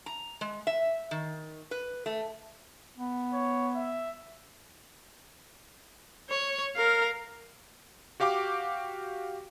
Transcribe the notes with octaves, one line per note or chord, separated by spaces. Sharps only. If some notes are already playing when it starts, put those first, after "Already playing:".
A#5
G#3
E5
D#3
B4
A3
B3
C#5
E5
C#5
A#4 F5
F#4 G4 F5 G5 D6